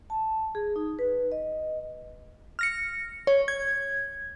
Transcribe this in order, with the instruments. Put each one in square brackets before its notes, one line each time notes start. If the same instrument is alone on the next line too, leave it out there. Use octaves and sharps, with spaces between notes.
[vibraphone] A5
G#4
D#4
B4
D#5
[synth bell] F6 A#6 C#7
C#5
G#6